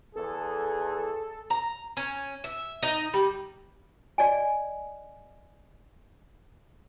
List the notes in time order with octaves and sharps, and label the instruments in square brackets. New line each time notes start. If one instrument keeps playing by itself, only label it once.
[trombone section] E2 G#4 [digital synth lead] A4
[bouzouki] A#5
C#4
E5
D#4
G3
[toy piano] D5 D#5 G#5